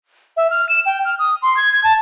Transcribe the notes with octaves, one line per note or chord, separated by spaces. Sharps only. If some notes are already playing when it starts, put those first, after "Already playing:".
E5
F6
E7
G5
F6
D#6
C6
G#6
G#6
A5